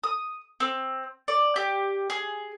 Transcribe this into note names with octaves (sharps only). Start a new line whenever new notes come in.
D#6
C4
D5
G4
G#4